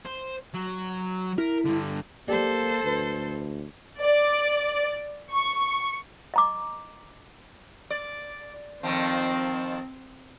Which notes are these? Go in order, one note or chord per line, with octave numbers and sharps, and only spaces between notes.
C5
F#3
E4 A#4
G2 D3
A#3 G4 A4 C5 D5
D2 B4
D5
C#6
D#5 A#5 D6
D5
F2 D#3 F3 C4